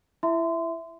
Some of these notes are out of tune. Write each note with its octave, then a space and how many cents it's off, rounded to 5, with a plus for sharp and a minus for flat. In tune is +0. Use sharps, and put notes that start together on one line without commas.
E4 +25 E5 +0 C6 -30